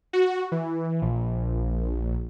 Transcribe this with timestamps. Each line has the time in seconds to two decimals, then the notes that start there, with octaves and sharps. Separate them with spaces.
0.13 F#4
0.52 E3
1.02 A#1